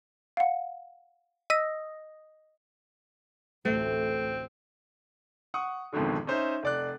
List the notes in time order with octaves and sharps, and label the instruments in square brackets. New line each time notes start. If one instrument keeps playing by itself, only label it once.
[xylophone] F5 F#5
[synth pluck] D#5 D#6 A#6 [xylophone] E6 B6
[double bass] A1 D2 [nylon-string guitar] A3 [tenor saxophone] C4
[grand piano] F#5 C#6 D#6
G#1 F2 G#2 B2 D3
C#4 D#4 C5 E5
F1 D5 F#6